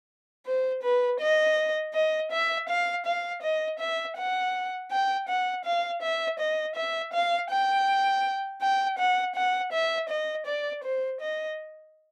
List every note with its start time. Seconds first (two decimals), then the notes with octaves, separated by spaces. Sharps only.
0.46 C5
0.83 B4
1.20 D#5
1.94 D#5
2.32 E5
2.69 F5
3.06 F5
3.42 D#5
3.80 E5
4.16 F#5
4.91 G5
5.28 F#5
5.65 F5
6.02 E5
6.39 D#5
6.76 E5
7.13 F5
7.50 G5
8.61 G5
8.98 F#5
9.35 F#5
9.72 E5
10.09 D#5
10.46 D5
10.84 C5
11.21 D#5